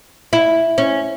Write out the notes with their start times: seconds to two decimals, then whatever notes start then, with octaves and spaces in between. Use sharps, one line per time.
0.33 E4
0.78 C#4